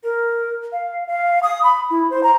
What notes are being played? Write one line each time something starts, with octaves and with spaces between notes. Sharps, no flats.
A#4
F5
F5
D#6
B5
E4
C5
A#5